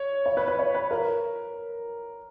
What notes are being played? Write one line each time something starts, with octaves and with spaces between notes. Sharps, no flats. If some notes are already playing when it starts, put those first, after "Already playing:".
Already playing: C#5
C#5
B4
B4
C#5
B4
A#4